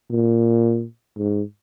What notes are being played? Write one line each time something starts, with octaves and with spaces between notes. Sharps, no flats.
A#2
G#2